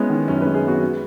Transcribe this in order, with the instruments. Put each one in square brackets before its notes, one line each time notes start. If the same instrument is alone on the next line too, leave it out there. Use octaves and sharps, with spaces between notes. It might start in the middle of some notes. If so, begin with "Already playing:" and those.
Already playing: [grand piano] G#3 B3 E4 [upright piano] C#4
[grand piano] D#3
[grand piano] F#2 [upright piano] C#4
[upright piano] B4
[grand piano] G#3
[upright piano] G#4
[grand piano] B3 [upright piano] F#4
[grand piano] G#3